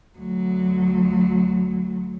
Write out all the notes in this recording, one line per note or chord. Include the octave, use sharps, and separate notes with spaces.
D2 F#3